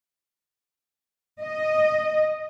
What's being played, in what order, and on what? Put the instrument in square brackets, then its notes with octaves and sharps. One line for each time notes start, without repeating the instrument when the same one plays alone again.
[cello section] D#5